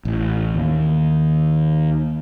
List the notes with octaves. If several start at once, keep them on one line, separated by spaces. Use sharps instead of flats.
A1
D#2